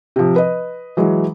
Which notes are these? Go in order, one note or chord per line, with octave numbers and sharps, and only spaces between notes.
C3 F3
B4 D#5
E3 F#3 G#3